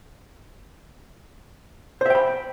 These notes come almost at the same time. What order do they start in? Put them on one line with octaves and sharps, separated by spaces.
C5 E5 G5 B5